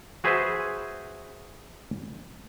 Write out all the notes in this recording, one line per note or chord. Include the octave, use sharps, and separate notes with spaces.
F#4 G#4 B4 C5 E5 G#5